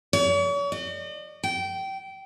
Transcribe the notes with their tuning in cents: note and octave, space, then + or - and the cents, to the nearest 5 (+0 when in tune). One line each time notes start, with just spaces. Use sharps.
C#5 +40
D#5 -45
G5 -20